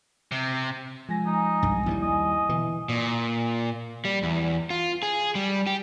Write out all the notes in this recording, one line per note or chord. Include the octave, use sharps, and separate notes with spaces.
C3
F3 G#3 G#5 A#6
D#4
B1 G2
D#2 F3 G3 E4
D#5
B2 D3 E3 E4
A#2
G3
E2
F4
G#4
G3
G4